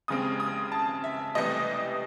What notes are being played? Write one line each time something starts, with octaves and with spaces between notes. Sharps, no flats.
D#2 C#3 G#3 C4 D#6
D#6
A5
E5
C2 C3 E3 A3 C4 D#5